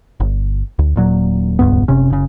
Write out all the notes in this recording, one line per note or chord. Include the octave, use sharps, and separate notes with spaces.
G1
D2
D#1 A#2 F#3
D#1 C#2 G2 B3
F#1 C3 C#4
F#1 C#3